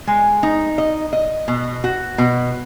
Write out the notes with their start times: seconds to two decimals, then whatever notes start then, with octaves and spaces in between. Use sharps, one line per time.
0.07 G#3
0.43 D#4
0.78 D#5
1.13 D#5
1.48 B2
1.84 F#4
2.18 B2